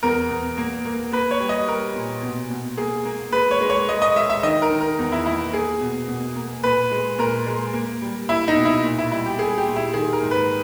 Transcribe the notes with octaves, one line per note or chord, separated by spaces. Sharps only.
E2 A#4
E2
A#3
A#3
A#3 B4
C#5
G3
D#5
G3 A#4
A#2
B2
B2
A#3 G#4
A#3
G#3 B4
C#5
G#3
C#5
G#3 D#5
D#5
G#3 E5
E5
D#3 D#5
A#4
D#3
A#4
E2
E4
A#3 E4
A#3 G#4
B2
B2
A#3
A#2 B4
G#3
A#2 A#4
G#3
A#3
G3
A#3 E4
D#4
B2
E4
A#2
E4
G3 E4
G4
G3 G#4
G4
A#2
E4
D#3 G#4
A#4
G#2
B4